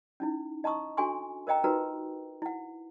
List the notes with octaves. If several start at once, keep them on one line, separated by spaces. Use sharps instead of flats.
C#4 D#4 E4
D#5 A5 A#5 C#6 D#6
D4 F#4 A4 G#5 C6 C#6
A#4 C5 D#5 G5 A#5
D#4 F4 F#4 A#4 B4 A#5
E4 F#5